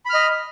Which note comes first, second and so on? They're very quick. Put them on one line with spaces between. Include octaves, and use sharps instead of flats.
B5 F6 D#5